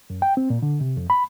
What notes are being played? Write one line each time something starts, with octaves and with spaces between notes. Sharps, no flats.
F#2
G5
C4
A#2
D3
C3
F2
B5